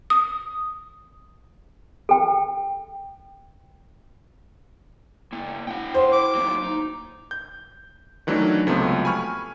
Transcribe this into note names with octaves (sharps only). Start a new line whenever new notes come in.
D#6
A4 G5
A#3 E4
E4 F#5 G5
C5
D6
F#3 A#3 D#4
D#4
G6
D#3 E3 F#3 A3 D4 D#4
C#2 C3 F3 F#3 A3 B3
G#5 B5 C#6 F6